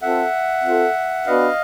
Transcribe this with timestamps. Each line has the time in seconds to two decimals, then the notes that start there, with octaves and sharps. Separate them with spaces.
0.02 C4 F4 A4 E5 F#5
0.64 C4 F4 A4
1.26 B3 D4 F#4 B4 D#5 F5